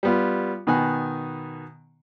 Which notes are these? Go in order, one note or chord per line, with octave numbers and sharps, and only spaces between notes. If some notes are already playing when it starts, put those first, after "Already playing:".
G3 B3 F4
B2 D#3 B3 G#5 F#6